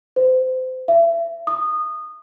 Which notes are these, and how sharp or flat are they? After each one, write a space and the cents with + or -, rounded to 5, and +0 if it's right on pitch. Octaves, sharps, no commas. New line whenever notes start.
C5 -30
E5 +35
D#6 -20